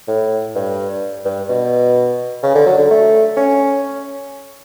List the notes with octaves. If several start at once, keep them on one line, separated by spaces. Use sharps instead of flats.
A2
G2
G2
B2
C#3
D3
F#3
D3
A3
C#4